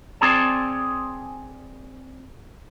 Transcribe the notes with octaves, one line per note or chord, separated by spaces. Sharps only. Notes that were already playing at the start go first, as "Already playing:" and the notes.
C4 G#4 D5 A5